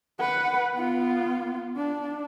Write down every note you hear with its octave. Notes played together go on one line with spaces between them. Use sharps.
B4 F#5
B3 F4
D4